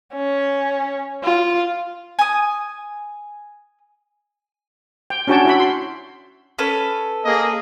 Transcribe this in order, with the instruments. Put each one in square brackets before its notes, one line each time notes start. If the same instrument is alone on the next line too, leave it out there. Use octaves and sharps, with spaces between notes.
[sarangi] C#4
F4
[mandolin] G#5 D#6
[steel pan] G5
C#4 D4 F#4 C#5 G5 A5
E4 F#4 B5
C6
[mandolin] C#4 A4 B4
[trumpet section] A#3 G#4 D#5